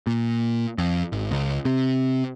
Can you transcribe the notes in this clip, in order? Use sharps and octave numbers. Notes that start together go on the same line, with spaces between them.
A#2
F2
G#1
C#2
C3